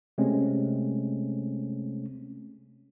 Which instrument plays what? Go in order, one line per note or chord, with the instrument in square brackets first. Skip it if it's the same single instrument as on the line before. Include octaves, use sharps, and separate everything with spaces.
[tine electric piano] C3 G#3 A3 C4 C#4